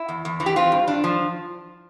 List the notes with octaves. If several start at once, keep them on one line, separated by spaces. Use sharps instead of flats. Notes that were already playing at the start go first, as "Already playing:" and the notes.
Already playing: E4
E2
E2
E3
G4
C4 F4
G2
G2 D4
F3